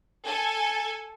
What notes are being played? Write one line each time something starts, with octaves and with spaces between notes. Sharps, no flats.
A4 G#5